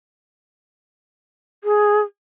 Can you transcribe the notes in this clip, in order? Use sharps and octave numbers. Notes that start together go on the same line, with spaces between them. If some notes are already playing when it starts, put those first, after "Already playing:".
G#4